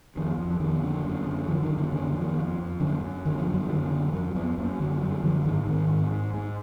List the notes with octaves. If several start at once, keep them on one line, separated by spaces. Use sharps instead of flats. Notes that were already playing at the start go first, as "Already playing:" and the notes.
F2 D#3
F2
F3
F2 D#3
D3
F#2
D3
D3 F3
D#3
F#2
D3
D3 D#3
D3
F2
D#3
F2
F2
F#2 D3
F#2
D3 D#3
F3
F#2
F#3
F3
D3 D#3
D3
F2 F#3
F2 B3
F#2 A#3
D3 F#3
F#2 F#3
D3 F3
G#2 D#3
G#2 D#3
G#2
G#2
G#2